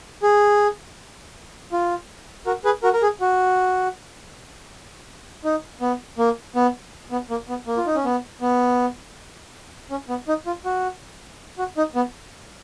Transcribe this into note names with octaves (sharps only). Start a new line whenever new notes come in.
G#4
F4
F#4 A#4
G#4 B4
F#4 A#4
A#4
G#4
F#4
D#4
B3
A#3
B3
B3
A#3
B3
A#3
F4
D#4
C#4
B3
B3
C#4
B3
D#4
F4
F#4
F#4
D#4
B3